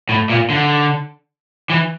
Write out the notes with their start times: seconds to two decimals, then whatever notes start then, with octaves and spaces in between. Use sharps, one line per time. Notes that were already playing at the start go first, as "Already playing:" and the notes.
0.09 A2
0.30 A#2
0.50 D3
1.70 E3